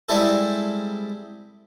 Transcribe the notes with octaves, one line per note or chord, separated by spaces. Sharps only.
G3 G#3 C4 E4 G#4 A4